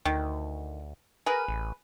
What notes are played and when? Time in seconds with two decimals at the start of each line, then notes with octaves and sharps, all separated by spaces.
0.05 D2 D#3
1.26 G#4 A#4 B4
1.48 A1